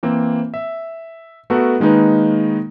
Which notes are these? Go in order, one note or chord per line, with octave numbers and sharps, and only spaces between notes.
E3 A#3 C4
E5
A3 B3 F#4 A4 A#4
D#3 G#3 A#3 D#4 B4